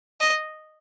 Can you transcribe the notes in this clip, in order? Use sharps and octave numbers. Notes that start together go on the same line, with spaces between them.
D#5